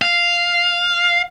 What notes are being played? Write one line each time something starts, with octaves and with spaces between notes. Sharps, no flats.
F5